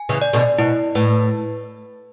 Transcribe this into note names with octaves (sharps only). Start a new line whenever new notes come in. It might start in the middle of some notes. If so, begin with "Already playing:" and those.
Already playing: G#5
C#3 E3
D5
B2 D3
B2 E4
A2 B4